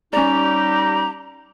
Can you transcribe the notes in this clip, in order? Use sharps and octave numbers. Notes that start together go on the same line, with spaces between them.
G3 C#4 D#4 G4 D5 A#5